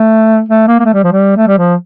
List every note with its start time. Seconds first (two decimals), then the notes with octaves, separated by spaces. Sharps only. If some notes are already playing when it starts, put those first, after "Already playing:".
Already playing: A3
0.49 A3
0.67 A#3
0.80 A#3
0.85 A3
0.94 G3
1.04 F3
1.12 G3
1.37 A3
1.48 G3
1.58 F3